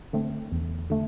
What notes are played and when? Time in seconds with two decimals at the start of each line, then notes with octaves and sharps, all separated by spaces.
0.13 D3 A3 C4
0.52 E2
0.90 D3 A3